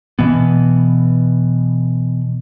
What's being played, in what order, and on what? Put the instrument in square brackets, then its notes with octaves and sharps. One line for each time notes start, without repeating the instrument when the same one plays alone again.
[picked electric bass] B2 E3 B3